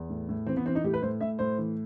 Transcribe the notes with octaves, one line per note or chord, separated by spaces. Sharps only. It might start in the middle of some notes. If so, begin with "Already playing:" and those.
Already playing: E2
A2
A2
E3 C4
B3
E3 C4
D#4
A2 G4
B4
A2 C5
A2 E5
A2 C5
E3